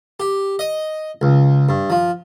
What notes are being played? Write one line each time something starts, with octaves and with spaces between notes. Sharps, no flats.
G4
D#5
C#2
G2
F3